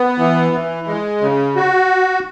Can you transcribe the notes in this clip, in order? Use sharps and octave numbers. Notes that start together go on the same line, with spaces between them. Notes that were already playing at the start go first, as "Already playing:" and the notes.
Already playing: B3
E3
E3
G#3
C#3
F#4